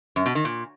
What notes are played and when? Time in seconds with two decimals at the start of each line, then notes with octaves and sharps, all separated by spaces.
0.16 F#2
0.26 B2
0.35 D#3
0.45 A#2